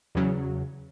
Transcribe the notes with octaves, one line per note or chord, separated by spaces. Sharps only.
E2 C#3 F#3